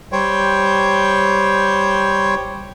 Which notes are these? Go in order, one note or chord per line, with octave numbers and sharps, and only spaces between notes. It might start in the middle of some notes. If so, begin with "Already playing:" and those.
G3 C5 C#5 G5